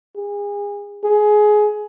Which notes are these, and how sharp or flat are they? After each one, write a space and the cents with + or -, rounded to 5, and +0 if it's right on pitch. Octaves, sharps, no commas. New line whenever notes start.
G#4 -30
G#4 +20